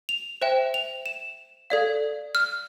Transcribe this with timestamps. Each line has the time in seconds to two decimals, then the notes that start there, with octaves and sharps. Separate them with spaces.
0.09 F7
0.42 C5 E5 G5 E7
0.74 F7
1.06 E7
1.70 A4 D5 F5
2.35 F6